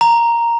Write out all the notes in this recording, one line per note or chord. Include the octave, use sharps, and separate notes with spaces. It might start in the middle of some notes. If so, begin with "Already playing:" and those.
A#5